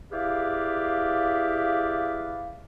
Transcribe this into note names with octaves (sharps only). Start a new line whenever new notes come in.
E4 G4 G#4 B4 D5 F5